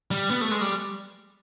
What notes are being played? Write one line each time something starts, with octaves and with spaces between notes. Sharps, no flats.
G3
B3
A3
G#3
G3